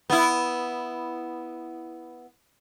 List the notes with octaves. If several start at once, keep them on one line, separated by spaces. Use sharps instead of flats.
B3 E4